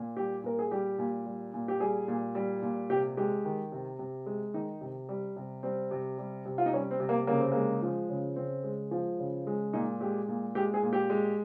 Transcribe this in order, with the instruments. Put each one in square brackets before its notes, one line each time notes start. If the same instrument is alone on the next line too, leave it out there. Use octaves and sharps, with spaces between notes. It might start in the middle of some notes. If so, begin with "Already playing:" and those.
Already playing: [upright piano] A#2
G3 G4
A#2 A#4
G#4
G3 G4
A#2
G3
A#2
G4
G3 G#4
A#2
G3
A#2
C3 G4
G#3 G4
D#3
C3
C3
G#3
D#3 D#4
C3
G3
C3
G3 C4
C3
G3
C3
F4
D#4
G3 C#4
C4
C3
A#3
C#3 A#3
C4
G#3 A#3
F3
C#3
C#3 C4
G#3
F3
C#3
G#3
A#2 D#4
G#3 G4
A#2
G#3 G4
G#4
A#2
G4
G#3